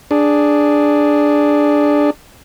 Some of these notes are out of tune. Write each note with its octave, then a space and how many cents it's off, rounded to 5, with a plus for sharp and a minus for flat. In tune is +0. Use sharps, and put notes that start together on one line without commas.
D4 +0 G#4 +0